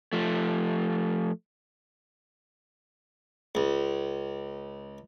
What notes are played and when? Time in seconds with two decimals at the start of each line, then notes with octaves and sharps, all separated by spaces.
0.13 F3 A3
3.55 C#2